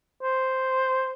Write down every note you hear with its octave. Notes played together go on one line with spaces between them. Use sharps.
C5